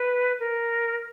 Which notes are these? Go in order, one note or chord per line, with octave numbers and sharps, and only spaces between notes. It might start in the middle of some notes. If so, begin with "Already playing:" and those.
Already playing: B4
A#4